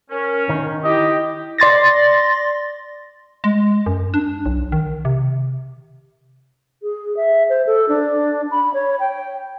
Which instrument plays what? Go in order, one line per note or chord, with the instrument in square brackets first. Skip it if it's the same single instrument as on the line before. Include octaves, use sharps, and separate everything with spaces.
[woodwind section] C#4 [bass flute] A#4
[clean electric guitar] D#3 [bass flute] D#4
[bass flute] E4 [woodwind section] G4 [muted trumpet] D#5
[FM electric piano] D5 C6 A6 A#6
[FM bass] G#3
F#2
D4
B1
D#3
C3
[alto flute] G#4
E5
C5
A4
D4
B5
C#5
G5